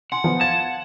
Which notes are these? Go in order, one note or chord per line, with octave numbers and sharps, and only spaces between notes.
F#5 G#5 C6
F3 B3
F5 A5 G#6